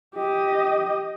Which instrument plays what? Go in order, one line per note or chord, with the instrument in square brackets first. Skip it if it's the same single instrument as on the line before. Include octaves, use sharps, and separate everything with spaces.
[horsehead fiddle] G4 D#5